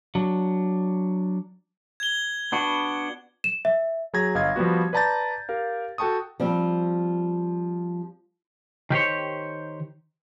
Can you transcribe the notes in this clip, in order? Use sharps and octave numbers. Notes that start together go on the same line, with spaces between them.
F#3 D4
G#6 G7
B3 D4 F#4
E7
E5
F#3 G#4 A#5 G#6 A#6
G1 D#5 F5 G#6
F3 G3 B3 F#4
B4 D5 A5 A#5 G6 A6
G4 A#4 F5
F#4 A4 G5 A5 C#6 D#6
F3 G3 C4
D#3 G4 C5 C#5